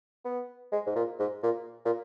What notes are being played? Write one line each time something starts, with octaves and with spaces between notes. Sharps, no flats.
B3
G#3
G#2
A#2
G#2
A#2
A#2